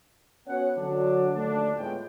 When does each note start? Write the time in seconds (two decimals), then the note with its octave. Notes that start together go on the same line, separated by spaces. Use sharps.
0.47 B3 C#4 F#4 C#5 F#5
0.78 D3 F#3 D4
1.34 D#2 D3 F3 A3 D4
1.78 A2 G#3 B3 F4 G5